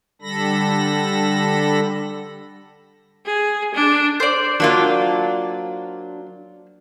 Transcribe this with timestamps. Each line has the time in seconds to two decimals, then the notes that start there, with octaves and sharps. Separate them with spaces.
0.22 D3 G3 A4 B5 A#6
3.26 G#4
3.75 D4
4.20 C5 D5
4.60 F#3 A#3 D4 F4